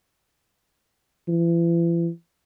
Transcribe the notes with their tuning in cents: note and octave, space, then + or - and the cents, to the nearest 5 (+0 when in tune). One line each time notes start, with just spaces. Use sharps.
E3 +40